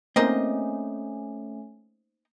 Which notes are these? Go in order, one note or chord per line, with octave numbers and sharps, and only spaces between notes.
A3 A#3 C4 C#4 D#4 A#4 C5 D#5